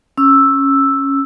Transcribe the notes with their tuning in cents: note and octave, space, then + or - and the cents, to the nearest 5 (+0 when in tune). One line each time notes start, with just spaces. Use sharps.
C#4 -10 E6 +0